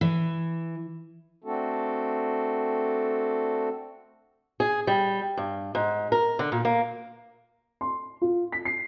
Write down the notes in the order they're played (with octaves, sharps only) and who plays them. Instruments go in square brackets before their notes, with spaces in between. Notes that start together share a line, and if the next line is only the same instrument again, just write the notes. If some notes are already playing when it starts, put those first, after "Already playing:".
[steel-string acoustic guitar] E3
[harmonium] A3 C4 D4 F#4 A4
[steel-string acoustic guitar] G#4
G3
G2
G#2
A#4
D3
A#2
A#3
[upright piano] C6
F4
B6
C7